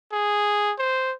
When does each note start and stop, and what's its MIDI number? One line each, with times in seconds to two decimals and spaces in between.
0.12 0.74 68
0.79 1.14 72